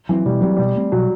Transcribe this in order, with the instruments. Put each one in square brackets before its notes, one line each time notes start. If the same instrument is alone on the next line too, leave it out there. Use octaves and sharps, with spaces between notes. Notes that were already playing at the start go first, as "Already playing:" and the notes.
[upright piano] E3 [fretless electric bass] F#3 C4
[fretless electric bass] B2 [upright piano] G3
[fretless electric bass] F#3 C4 [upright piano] G3
[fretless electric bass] B2 [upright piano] G3
[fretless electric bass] A3 C4
[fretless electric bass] B2 [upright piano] F#3